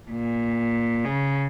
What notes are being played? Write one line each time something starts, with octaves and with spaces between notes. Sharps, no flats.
A#2
C#3